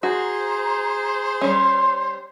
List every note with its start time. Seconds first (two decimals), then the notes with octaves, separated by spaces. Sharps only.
0.03 F#4 G#4 C5 A#5
1.41 G3 C#4 C6